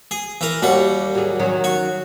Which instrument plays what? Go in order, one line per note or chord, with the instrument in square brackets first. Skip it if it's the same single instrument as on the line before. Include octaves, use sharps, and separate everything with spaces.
[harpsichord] G#4
E3 A#4
[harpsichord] D#2 G3 F#5 [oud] F#4
[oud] F#3 G#4
D#3 F#3 C#4
[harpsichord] F#4